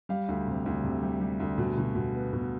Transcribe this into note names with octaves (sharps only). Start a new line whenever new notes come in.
G3 F5
D2
C3
D2
C3
G3
G3
D2
B2
B2
B2
B3
B2